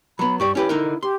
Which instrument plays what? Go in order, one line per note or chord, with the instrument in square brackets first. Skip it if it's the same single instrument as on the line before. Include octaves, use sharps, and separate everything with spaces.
[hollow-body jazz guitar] F#3 B3 [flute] B5
[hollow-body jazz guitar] G2 G4 D5 [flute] C#6
[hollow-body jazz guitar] C#4 G4 B4 [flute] E4
[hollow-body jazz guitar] D3 D#4 A#4
[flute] G4 [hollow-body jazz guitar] C6